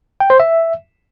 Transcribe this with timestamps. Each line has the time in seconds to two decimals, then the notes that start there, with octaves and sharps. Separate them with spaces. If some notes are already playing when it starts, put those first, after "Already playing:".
0.20 G5
0.30 C5
0.40 E5